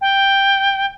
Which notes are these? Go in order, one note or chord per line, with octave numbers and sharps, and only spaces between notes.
G5